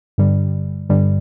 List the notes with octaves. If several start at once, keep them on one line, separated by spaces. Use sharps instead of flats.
G2 D3 G3
G2 D3 G3